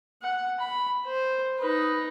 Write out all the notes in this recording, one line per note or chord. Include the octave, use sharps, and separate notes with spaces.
F#5
B5
C5
D#4 B4